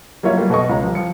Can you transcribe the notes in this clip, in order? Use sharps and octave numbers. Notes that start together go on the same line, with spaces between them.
F#3 G3 A#3 F4 C#5 E5
F#3 G3 A3 A#3
B2 A4 D#5 C#6
C#2 C#5 A#5
F3 G3
F3 C#7